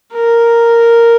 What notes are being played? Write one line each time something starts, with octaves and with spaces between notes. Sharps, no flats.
A#4